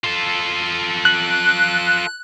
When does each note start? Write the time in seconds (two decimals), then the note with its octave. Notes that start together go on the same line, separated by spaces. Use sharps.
0.04 F4 A4
1.05 F#6